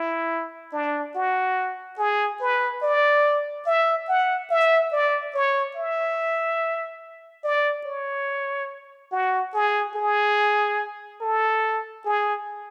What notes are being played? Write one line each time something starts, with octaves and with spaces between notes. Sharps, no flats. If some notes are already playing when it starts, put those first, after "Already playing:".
Already playing: E4
D4
F#4
G#4
B4
D5
E5
F#5
E5
D5
C#5
E5
D5
C#5
F#4
G#4
G#4
A4
G#4